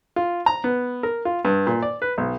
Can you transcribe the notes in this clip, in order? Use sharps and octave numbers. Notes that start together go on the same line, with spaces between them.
F4
A#5
B3
A#4
F4
G2
A#2
D5
B4
B1